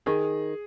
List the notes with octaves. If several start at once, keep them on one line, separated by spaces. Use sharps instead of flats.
D#3 G#4